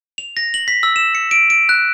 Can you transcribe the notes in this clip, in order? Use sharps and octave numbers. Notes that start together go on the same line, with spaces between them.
F7
A#6
F#7
B6
E6
E7
C#7
D7
D7
F#6